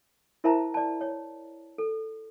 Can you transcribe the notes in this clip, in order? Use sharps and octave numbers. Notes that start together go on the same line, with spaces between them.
E4 A#4 C5 E5 A5 A#5
D5 A5
C#5
A4